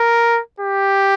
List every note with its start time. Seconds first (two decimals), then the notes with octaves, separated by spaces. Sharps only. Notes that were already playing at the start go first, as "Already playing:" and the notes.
Already playing: A#4
0.60 G4